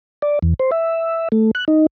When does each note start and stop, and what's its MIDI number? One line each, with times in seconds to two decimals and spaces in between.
0.22 0.39 74
0.42 0.54 40
0.59 0.71 72
0.71 1.28 76
1.32 1.51 57
1.55 1.65 90
1.68 1.86 63